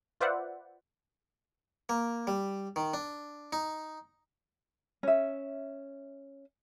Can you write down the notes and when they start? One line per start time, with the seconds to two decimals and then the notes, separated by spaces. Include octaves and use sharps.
0.20 F4 B4 C5 D5 E5 F#5
1.89 A#3
2.27 G3
2.76 D#3
2.94 D4
3.53 D#4
5.03 C#4 E5